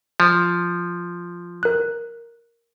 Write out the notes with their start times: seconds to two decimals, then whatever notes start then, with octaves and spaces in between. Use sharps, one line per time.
0.20 F3
1.63 A#4 F#6